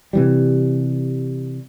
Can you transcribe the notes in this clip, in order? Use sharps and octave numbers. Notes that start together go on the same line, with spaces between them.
C3 E3 G3